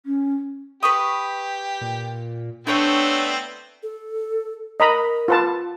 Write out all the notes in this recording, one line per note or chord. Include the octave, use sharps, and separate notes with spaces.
C#4
G4 B4 C#6 D#6
A#2
A3 B3 C4 D4 C5 C#5 G5
A4
A#4 D#5 A#5 B5
F4 B4 A5